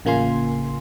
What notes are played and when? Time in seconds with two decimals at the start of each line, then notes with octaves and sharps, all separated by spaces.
0.05 A1 C#3 A#3 F4 G#5 C6